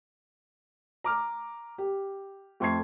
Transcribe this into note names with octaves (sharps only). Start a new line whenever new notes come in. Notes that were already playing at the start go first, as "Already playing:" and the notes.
A#5 D6 F6
G4
F2 A3 C6 C#6 G#6 C7